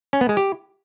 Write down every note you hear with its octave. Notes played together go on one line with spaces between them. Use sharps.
C#4
B3
G#3
G4